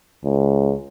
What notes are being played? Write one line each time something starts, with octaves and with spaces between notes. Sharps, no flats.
C#2